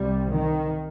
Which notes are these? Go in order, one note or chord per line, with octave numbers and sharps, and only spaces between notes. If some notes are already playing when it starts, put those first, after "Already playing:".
Already playing: C2 C3 G3
D#3